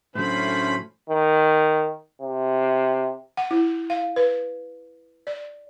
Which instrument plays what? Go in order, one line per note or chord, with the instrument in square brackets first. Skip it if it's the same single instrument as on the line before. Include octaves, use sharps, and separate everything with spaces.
[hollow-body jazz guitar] A2 F#3 [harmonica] D3 C5 [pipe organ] A3 C#4 B5
[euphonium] D#3
C3
[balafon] F#5
E4
F5
B4
D5